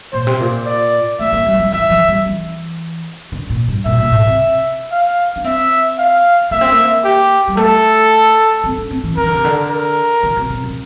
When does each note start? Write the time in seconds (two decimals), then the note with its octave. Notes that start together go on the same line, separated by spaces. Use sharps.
0.13 A#2 C5
0.27 C3
0.40 A#2
0.66 D5
1.19 A3 E5
1.33 A#3
1.46 G3
1.59 F3
1.73 E3 E5
1.90 F3
2.08 G3
2.26 E3
3.32 D3
3.50 A#2
3.68 G2
3.86 A#2 E5
3.98 A#2
4.12 A2
4.25 C3
4.92 F5
5.36 D4
5.44 C4 E5
5.99 F5
6.51 A#3 E5
6.61 C4
6.72 A#3
7.04 G4
7.48 G3
7.57 A3 A4
8.64 C4
8.77 D4
8.91 C4
9.04 E3
9.17 E3 A#4
9.26 D3
9.35 C3
9.45 D3
9.70 A#4
10.23 D3
10.37 C3
10.50 C3
10.64 F3